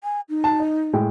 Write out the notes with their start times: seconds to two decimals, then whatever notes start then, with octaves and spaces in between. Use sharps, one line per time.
0.04 G#5
0.29 D#4
0.44 A5
0.60 D#5
0.93 A2 G#3 G5